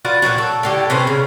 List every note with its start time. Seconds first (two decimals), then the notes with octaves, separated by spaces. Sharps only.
0.05 F4 F#4 B4 D5
0.22 A#2 D#3 F#3 F#4
0.38 A4
0.63 A2 D3 G4
0.90 C3 B3 C#4 C5
1.07 C#3